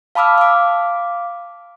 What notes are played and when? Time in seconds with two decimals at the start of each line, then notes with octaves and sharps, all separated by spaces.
0.15 F5 A5 B5 D6 E6 F6
0.38 F5 D6